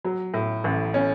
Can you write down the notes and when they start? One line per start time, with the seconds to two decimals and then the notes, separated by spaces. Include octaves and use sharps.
0.05 F#3
0.34 A2
0.64 A1
0.94 C#4